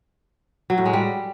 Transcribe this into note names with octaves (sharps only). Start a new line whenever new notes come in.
F#3
A2
G#3
G3